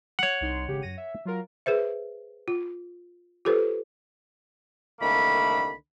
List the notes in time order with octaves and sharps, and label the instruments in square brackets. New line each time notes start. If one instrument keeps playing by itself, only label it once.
[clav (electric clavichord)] C#5 F#5
[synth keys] C2 D#4 C6
G#1 C#3 G4
F#2 A#6 D#7
E5
F#3 F4 A#4
[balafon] G#4 B4 C5 E5
F4
F4 G4 A4 B4 C5
[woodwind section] C2 D3 D#3 A3 A#3 B5